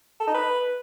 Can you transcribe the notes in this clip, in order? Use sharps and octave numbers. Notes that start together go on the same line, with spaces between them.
A4
D#4
B4